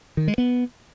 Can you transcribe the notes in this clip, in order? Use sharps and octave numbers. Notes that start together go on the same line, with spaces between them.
D#3
G#3
B3